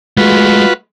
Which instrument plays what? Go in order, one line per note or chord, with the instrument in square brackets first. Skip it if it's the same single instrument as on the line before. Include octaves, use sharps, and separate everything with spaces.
[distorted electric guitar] G#3 A3 [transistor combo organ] F4 F#4 B4